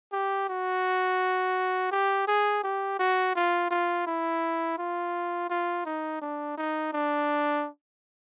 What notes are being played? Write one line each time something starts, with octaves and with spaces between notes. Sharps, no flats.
G4
F#4
G4
G#4
G4
F#4
F4
F4
E4
F4
F4
D#4
D4
D#4
D4